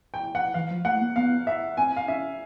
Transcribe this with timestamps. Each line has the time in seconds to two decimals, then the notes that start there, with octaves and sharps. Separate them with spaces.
0.14 G5
0.35 F#5
0.54 E3 F5
0.71 F3
0.85 A3 F#5
1.01 A#3
1.16 B3 F5
1.47 E5
1.77 C4 G#5
1.97 F5
2.08 C#4 E5